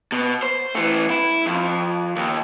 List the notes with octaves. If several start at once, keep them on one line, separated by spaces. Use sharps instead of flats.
B2
C5
E3 A3
E4
F2
D#2